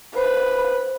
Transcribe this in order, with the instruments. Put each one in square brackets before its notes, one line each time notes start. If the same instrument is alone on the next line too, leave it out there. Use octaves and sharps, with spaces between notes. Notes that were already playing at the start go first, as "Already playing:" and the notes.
[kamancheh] B4 [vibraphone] C5